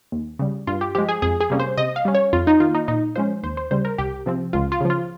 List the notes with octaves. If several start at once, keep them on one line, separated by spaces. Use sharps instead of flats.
D#2
C#3 G3
G2 F4
G4
F3 G#3 G4
G#4
F2 G#4
G#4
C3 G3 A#3 C#4
C5
C3 D#5
F5
G3 C#4
C#5
F2 F4
D#4
D#3 A#3 F4
D#4
A#2 D#4
F3 G#3 C#4 C5
D#2 C5
C5
C#3 G3 C5
A#4
C2 G4
C3 F3 C4
C#2 F4
F4
C#3 F3
F4